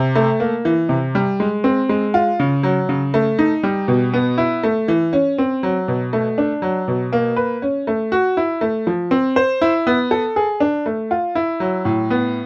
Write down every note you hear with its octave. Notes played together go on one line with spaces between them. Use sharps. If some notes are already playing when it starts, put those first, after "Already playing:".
Already playing: C3
A3
A#3
E3
C3
G3
G#3
C4
G#3
F4
C#3
F#3
C#3
A3
D#4
G3
B2
B3
E4
A3
E3
C#4
C4
F#3
B2
A3
D4
F#3
B2
A#3
B4
C#4
A3
F#4
E4
A3
F3
C4
C5
E4
B3
A4
G#4
D4
A3
F4
E4
F#3
A2
B3